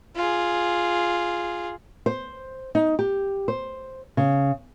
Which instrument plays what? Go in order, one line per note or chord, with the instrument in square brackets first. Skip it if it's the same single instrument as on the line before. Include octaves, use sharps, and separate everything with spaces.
[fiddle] F4 G#4
[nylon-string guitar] C5
D#4
G4
C5
C#3